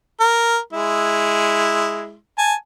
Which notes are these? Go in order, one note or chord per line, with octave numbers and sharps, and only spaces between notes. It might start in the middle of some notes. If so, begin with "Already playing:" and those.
A#4
G#3 E4
G#5 A5